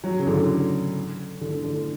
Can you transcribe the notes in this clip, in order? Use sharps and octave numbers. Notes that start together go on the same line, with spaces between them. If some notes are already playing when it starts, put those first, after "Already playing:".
F#3
C#3
D3
D3
D3